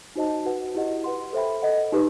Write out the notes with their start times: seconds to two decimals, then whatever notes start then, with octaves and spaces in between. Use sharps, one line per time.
0.16 D#4 F#4 C5 D#5 A5
0.45 F#4 B4 F#5
0.75 E4 G4 D#5 F#5
1.04 B4 F#5 C6
1.33 A4 C5 E5 G5 B5
1.63 A4 D#5 F#5
1.92 D#4 G4 B4